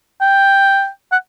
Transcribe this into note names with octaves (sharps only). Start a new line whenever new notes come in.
G5
F#5